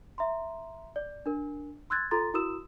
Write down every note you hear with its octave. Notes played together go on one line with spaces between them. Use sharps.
E5 A#5 C6
D5
D4 A#4
C6 E6 F#6 G#6 A6
F4 A4 A#5 C6 A6
E4 F#4 A#4 D#6 E6 E7